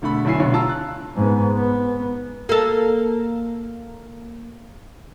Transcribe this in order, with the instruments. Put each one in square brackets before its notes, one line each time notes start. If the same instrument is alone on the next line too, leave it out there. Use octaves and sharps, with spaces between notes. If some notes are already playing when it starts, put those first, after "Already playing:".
[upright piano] E1 D3 A3 B5
G1 F#3 D4 E4 G#5 C7
F1 B1 D3 C#5
F4 A5 A#5 E6
F#6
[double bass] G#2 B3
B3
[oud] A#3 A4